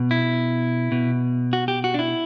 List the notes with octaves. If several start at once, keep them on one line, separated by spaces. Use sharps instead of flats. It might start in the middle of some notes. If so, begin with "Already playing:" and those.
Already playing: B2
E4
B2
F#4
G4
F#4
D4
E4